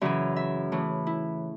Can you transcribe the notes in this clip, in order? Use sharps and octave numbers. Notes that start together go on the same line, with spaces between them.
F#2 C#3 E3 E5
E5
A2 E3
E4